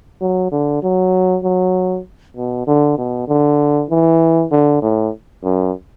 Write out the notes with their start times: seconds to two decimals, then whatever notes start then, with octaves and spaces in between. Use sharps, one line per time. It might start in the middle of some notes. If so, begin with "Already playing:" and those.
0.21 F#3
0.51 D3
0.83 F#3
1.43 F#3
2.37 B2
2.67 D3
2.98 B2
3.28 D3
3.90 E3
4.51 D3
4.82 A2
5.44 F#2